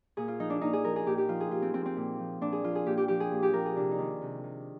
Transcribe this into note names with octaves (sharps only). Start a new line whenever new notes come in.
A#2 G#4
F4
F3 D#4
D4
A#2 D#4
G#4
F3 A#4
G#4
A#2 G4
G4
F3 F4
G#4
A#2 F4
C4
F3 C4
C4
A#2
F3
A#2 D4
G#4
F3 F4
G#4
A#2 G4
G4
F3 G4
G#4
A#2
G4
F3 A#4
G#4
C3 D4
D#4
D#3 D4
C3
D#3